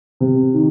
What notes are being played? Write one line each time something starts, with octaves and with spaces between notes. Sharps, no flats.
C3
D#3